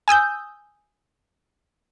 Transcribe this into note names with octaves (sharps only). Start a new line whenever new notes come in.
G#5 D#6 E6 G6